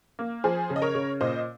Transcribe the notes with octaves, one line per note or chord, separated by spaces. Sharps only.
A#3
F3 G#4 C5
C#3
D#5
A#4 C#5
C#3
A#2 C5 D#5